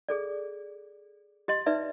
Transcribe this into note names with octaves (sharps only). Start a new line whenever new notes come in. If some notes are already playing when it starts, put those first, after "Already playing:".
G#4 A4 D5
G4 D#5 C6
D#4 B4 D5 E5